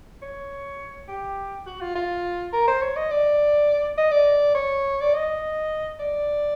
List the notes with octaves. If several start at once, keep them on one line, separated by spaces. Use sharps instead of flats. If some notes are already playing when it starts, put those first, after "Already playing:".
C#5
G4
F#4
F4
F4
A#4
C5
C#5
D#5
D5
D#5
D5
C#5
D5
D#5
D5